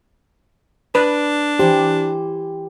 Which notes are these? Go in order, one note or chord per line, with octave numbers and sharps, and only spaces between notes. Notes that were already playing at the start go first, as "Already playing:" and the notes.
D4 B4 D5
E3 G4 C5